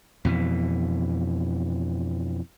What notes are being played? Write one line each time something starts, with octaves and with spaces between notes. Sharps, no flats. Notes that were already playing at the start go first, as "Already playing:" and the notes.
F2 B2 E3